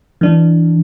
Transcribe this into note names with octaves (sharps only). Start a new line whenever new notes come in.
E3 D4